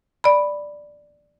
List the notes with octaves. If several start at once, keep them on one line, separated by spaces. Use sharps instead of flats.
D5 B5